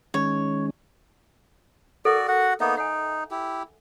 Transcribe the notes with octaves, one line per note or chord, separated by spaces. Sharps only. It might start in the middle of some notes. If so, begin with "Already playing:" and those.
D#3 G#3 C#4 C#5
F#4 A4 A#4 D5
F#4 F#5
A#3 B3 D#4 E5
D#4 F#5 G#5
E4 G4